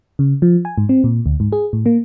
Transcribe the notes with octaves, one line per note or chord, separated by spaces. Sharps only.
C#3
F3
G#5
G#2
C4
A#2
D2
G#2
G#4
A2
A#3